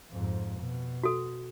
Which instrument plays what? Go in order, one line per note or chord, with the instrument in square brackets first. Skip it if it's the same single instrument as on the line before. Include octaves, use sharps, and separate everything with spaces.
[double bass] F2 G#2
B2
[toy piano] F#4 A4